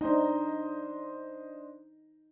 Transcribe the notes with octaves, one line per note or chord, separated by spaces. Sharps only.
D4 D#4 C5 D#5